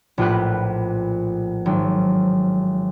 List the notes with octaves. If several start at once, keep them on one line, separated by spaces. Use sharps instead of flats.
A#1 A2 F4 G4 B4 F#6
G#1 F#3